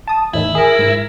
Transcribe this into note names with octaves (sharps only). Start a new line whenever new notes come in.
A5 D#6
E2 A2 D#3 E4
G#4 A#4
G#2